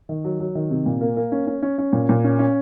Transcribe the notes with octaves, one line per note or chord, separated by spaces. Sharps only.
D#3
F#3
F#3
D#3
C3
A#2
A#3
A#3
C#4
C#4
C#4
C#4
A#2
A#2
C#4
C#4